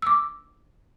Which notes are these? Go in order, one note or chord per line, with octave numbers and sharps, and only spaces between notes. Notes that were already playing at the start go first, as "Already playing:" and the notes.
D6 E6